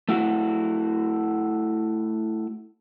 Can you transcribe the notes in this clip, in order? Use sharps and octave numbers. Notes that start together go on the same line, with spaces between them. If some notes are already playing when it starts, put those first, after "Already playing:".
A3 E4 F#4